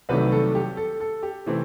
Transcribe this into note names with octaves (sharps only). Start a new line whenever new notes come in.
C2 C3 D#3 F#3 A3 B4
A4
G4
A4
A4
G4
C3 E3 A3 C4